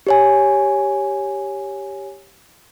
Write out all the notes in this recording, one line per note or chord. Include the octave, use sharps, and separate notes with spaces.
G4 C#5 G#5